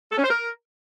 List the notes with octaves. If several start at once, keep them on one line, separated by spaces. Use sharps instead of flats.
A4
C#4
C5
A#4